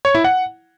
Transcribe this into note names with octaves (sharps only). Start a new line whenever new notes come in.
C#5
E4
F#5